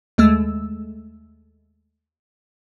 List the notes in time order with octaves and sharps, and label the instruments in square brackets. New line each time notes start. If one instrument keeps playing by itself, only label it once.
[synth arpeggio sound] D#2 G#3 A3 E6